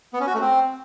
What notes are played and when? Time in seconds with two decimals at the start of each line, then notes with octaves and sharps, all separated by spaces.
0.13 B3
0.20 C#4
0.27 F#4
0.34 A3
0.41 C4